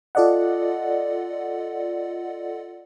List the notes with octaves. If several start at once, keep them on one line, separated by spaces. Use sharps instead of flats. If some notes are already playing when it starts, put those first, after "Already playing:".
F4 A4 D5 D#5 F#5